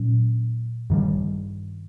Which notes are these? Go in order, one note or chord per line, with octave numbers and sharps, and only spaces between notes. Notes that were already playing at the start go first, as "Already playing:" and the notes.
Already playing: A#2 F#3 C#4
G2 D#3 G3